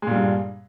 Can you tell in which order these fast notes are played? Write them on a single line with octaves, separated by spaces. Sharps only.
G#3 A#2 G3 G2